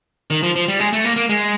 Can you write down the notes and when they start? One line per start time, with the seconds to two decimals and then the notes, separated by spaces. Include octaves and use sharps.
0.30 D#3
0.43 F3
0.55 F3
0.68 G3
0.79 G#3
0.93 A3
1.05 A#3
1.16 A#3
1.29 G#3